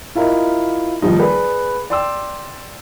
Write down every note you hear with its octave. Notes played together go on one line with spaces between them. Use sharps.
E4 F4 A#4 D#5
D#2 F3 G3 D#4
G#4 B4 D5
D5 G5 C6 D6 E6